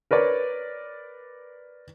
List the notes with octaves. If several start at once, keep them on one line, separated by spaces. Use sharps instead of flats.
A#4 B4 C#5 D5